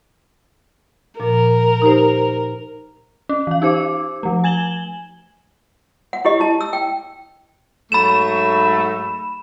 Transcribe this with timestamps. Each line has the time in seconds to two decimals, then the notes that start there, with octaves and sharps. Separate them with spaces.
1.20 A#2 F3 A#4
1.82 D#4 G4 C5
3.29 C#4
3.47 E3 F5
3.62 D#4 G4 C5 D6
4.23 F3 A3
4.44 G#5 G#6 E7 F#7 G7
6.13 F#5
6.25 E4 G4 D#5
6.40 E4 A5
6.61 E6
6.73 G5
7.92 G#2 F#3 A3 B5 E7